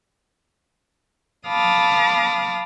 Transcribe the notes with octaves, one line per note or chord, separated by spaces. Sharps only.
F5 A5 B5 D6 D#6 F6